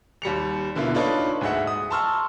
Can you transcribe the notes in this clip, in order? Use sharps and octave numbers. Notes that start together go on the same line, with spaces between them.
D#2 G3 C#7 F7
B2 D3 A#3 E4 F4
D4 D#4 F4 A4 B4 C#5
D2 G#2 G#3 E5 F#5
D#6
A5 A#5 C6 C#6 E6 F6